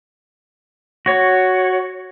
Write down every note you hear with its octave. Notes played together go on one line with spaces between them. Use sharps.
F#4 C#5